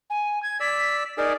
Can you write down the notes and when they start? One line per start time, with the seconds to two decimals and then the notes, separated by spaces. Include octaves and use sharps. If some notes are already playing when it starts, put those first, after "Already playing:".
0.10 G#5
0.43 G#6
0.60 D5 E6 B6
1.18 D#4 G#4 A#4 D5